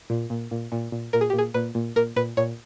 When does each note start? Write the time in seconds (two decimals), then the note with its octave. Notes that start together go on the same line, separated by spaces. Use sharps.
0.10 A#2
0.30 A#2
0.51 A#2
0.72 A#2
0.92 A#2
1.13 A#2 A#4
1.21 G#4
1.30 G4
1.33 A#2
1.38 G#4
1.54 A#2 B4
1.75 A#2
1.96 A#2 A#4
2.16 A#2 B4
2.37 A#2 C#5